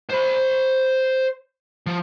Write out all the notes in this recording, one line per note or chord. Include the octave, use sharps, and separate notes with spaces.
C5 B5
F3